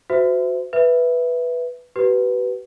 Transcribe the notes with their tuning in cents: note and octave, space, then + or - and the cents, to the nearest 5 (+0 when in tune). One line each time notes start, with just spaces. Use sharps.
F#4 -5 C5 -40 E5 +0
B4 +0 E5 +0
G4 -45 B4 +0